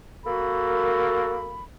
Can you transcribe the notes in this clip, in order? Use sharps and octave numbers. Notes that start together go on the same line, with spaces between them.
A#3 F#4 A4 A#4 B5